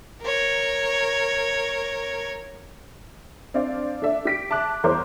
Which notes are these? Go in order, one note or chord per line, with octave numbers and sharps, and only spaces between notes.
A#4 C#5
C4 D4 D5 F5
D4 A4 D5 E5
G4 B6 D7
E5 A5 D6 F#6
E2 A#4 C5 C#5 D6